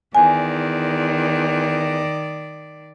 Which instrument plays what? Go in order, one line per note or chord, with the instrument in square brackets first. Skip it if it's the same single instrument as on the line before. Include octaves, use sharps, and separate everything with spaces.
[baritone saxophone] E2 [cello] D#3 D5 [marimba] G#5